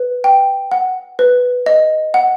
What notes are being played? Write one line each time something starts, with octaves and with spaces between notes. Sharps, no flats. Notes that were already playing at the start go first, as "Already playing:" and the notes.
Already playing: B4
G5
F#5
B4
D#5
F#5